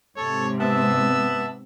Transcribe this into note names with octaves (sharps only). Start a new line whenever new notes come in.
G#2 C3 A4 C#5
B3 E5 A5 E6